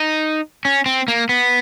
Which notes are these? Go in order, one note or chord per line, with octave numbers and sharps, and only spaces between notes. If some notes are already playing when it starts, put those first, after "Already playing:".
Already playing: D#4
C#4
C4
A#3
B3